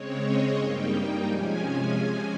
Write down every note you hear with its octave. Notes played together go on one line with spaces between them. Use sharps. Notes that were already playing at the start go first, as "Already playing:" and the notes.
Already playing: C#3 G#3 C4 C#5
D#5
G2 G3 A#3 D#4 G5
G5
C3 F3 G#3 C#4 G#5